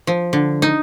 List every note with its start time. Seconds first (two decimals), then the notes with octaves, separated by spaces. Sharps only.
0.07 F3
0.33 D3
0.62 D#4